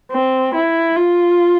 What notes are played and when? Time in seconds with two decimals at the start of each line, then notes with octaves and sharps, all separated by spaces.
0.12 C4
0.55 E4
0.96 F4